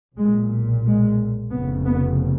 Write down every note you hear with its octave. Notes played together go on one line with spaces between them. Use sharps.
B1 A#2 G#3
G#3
F1 F2 C#3 B3
B3